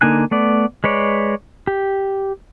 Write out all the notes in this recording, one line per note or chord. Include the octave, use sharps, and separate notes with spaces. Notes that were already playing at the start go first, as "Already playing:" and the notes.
D3 A#3 D#4 G#5 F#6
A3 B3 D5
G#3 B4 C#5 D5
G4